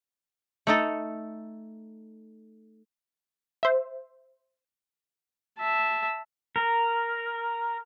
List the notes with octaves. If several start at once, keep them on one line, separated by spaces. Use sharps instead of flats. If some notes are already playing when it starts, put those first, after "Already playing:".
A3 D#4 A4
C5 E5
E5 A5
A#4